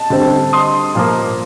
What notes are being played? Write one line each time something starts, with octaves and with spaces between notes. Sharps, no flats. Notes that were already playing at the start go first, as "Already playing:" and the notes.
Already playing: A5
D3 G3 C4
C6 D#6
A#2 F3 A#3